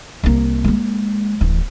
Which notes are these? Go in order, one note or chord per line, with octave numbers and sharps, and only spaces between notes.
C2 A#3
G#3 A#3
D1 E3